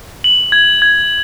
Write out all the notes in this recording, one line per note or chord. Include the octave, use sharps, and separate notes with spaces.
F#7
G#6
G#6